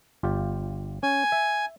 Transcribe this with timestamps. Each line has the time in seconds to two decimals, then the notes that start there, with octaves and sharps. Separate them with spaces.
0.23 G1 F4 G4
1.03 C#4 G#5
1.32 E5